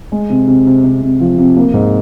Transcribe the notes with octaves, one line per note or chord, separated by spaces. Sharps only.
G#3
C3
C3
C3
C3
C3
F3
C3
A#3
G#2